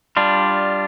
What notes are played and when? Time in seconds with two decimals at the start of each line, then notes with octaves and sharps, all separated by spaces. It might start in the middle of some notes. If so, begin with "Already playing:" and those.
0.17 G3 D4 F4